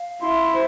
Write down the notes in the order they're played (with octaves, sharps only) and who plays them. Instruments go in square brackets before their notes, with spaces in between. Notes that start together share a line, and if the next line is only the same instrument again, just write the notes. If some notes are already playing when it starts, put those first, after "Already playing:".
Already playing: [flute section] F5
[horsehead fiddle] E4 [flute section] C6
[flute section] C5